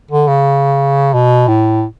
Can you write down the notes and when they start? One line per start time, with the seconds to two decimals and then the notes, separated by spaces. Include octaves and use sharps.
0.11 D3
0.28 C#3
1.13 B2
1.48 A2